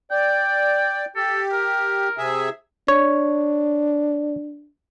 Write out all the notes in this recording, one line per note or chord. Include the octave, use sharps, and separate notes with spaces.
D5 G5
G4 A4
A#4
C3 G#4 E5
D4 C#5